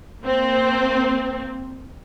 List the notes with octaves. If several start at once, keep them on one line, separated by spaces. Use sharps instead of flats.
A#3 C4